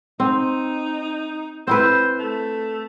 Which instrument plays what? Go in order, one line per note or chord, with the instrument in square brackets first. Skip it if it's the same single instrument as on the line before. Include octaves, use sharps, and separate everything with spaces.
[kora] C4 [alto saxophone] D#4
[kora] C4 E4 B4 [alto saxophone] C5
[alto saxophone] A3